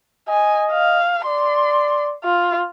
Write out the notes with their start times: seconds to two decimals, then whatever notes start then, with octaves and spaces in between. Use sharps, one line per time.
0.29 D#5 G#5
0.72 F5
1.25 D5 C6
2.24 F4